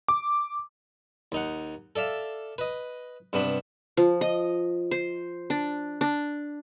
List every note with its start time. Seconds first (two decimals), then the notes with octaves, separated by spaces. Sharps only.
0.08 D6
1.32 D#2 D#4 F#5
1.96 A4 D5 E5 F5
2.58 B4 D#5
3.33 G2 C3 B3 D4 B5
3.97 F3
4.21 D#5
4.91 C5
5.50 D4
6.01 D4